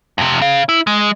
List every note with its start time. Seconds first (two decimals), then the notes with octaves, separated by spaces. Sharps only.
0.18 F2 C3
0.41 C#3 F5
0.69 E4
0.87 G#3